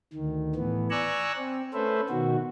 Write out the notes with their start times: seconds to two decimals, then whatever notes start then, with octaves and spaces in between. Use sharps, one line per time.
0.14 D2 D#3
0.55 A2 E3 B3
0.90 D5 G#5 A#5 C#6 E6 F#6
1.37 C4
1.74 A3 C#4 A4 B4 C5 E5
2.10 B2 D#3 F#4